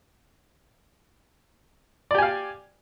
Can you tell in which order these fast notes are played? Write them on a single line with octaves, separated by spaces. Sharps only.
D5 G4 G#5 F5